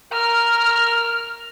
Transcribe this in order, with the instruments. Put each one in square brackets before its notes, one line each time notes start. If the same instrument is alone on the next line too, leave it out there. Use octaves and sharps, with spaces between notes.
[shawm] A#4 [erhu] F6